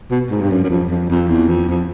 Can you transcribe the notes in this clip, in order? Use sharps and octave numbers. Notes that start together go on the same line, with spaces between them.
B2
G#2
G2
F#2
F#2
F2
F2
F2
E2
F2
F2